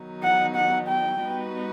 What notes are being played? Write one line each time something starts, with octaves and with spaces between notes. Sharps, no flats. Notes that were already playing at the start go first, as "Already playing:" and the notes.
Already playing: D#3 F#3 B3 D#4
F#5
F#5
G5
G3 B3 D#4 F#4 B4